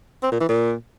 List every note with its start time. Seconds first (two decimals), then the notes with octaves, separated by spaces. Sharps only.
0.23 C4
0.31 A#2
0.40 E3
0.49 A#2